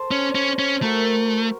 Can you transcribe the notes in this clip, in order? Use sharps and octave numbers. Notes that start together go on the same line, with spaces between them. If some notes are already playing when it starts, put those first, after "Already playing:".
Already playing: A4 C5
C#4
C#4
C#4
A3 F#4 A#4